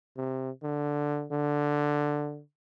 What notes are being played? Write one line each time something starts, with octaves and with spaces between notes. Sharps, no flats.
C3
D3
D3